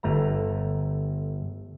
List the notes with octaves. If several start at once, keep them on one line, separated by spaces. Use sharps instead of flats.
G1 A3 A#5